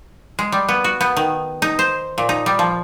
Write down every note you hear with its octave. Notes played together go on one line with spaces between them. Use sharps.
G#3
G3
B3
F#4
B3
D#3
D#4
C5
A#2
D#4
G3
F3